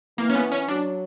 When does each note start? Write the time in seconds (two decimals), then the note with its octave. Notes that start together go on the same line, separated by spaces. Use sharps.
0.18 E3 A#3
0.30 C#4
0.35 B3
0.52 C#4
0.68 F#3 D4